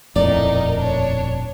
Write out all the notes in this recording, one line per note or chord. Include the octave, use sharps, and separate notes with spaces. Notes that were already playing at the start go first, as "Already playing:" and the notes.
D#1 F2 A2 D#4 A#4 D5
D4 C#5